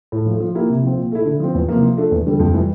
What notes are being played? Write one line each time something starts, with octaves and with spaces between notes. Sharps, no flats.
A2
F3 A3
F3
A#3 E4 G4
C3
F3 C4
A#2
A3 E4
D3
F3 C4
E2
C3 F3 A#3
F3
A3 D4 A4
E2
D3 G3 D4 A4
F2
E3 G3